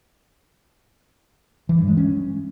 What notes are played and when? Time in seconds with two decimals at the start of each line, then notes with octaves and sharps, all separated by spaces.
1.69 E3
1.78 G2
1.88 G#3
1.97 C#4